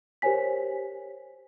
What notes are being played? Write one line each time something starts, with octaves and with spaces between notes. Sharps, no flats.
G4 A#4 C5 C#5 G#5 B6